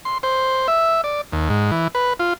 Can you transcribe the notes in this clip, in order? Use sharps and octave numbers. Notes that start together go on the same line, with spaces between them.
C6
C5
E5
D5
D#2
G#2
E3
B4
F4